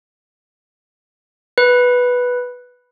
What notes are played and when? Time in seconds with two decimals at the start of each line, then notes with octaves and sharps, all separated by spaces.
1.58 B4